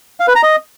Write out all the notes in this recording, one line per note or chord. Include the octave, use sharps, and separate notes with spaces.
F5
B4
A#5
D#5